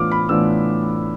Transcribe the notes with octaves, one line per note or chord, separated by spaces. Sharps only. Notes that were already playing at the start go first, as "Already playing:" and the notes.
Already playing: A2 E3 B3 D4 F4 D6 F6
B5
A2 E3 B3 D4 F4 E6